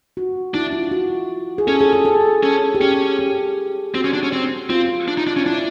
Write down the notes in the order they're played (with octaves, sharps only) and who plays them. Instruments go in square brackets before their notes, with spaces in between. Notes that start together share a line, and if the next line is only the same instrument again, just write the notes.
[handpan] F#4
[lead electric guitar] D4 [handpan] E4
[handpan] F4
F#4
G#4
[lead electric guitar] C#4 [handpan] A4
[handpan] G#4
A4
A4
[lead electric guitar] C#4
[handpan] G4
[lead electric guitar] C#4 [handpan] G#4
[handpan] G4
[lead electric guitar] C4 [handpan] F#4
[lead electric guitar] C#4
D4
C#4
C4
[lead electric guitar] C4 [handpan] F4
[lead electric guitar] D4
D#4
D4
C#4
[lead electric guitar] D4 [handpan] E4